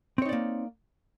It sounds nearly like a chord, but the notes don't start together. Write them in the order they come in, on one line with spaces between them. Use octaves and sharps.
C4 C#5 D#4 D5 A#3